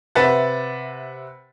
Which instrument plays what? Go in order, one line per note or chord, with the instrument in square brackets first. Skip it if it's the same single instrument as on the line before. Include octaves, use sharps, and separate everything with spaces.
[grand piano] C3 B4 E5 F#5 A6